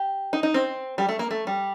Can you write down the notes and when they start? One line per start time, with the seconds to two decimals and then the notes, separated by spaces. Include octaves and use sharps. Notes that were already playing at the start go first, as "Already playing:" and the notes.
Already playing: G4
0.33 D#4
0.43 D#4
0.54 C4
0.98 G3
1.09 A3
1.19 A#3
1.31 A3
1.47 G3